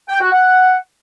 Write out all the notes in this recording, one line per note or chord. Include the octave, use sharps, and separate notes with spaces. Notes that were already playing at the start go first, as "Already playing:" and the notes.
G5
F#4
F#5